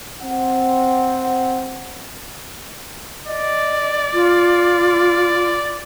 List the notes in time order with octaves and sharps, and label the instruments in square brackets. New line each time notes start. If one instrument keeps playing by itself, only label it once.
[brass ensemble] C4 F#5
[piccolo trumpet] D5 [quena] D#5
[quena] F4